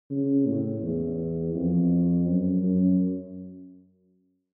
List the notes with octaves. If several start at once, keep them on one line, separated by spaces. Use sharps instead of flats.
C#3
A2
E2
F2
F#2
F#2